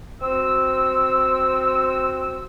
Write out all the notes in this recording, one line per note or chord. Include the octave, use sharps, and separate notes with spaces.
C4 F#4 E6